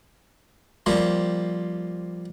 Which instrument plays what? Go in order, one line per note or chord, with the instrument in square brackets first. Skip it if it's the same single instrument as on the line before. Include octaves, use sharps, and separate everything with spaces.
[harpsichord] F3 G3 A#3 C4